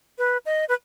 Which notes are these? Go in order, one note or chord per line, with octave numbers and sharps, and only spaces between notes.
B4
D#5
B4